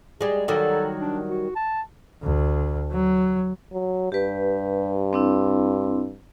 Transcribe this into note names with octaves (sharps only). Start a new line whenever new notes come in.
G3 G#3 G#4
D#3 F#3 G3 A4
D4
F#4
A5
D2
F#3
F#3
G2 G4 B4
C4 D4 E4